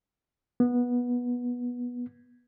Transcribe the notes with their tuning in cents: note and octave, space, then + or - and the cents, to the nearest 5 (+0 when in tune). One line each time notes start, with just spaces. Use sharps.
B3 -15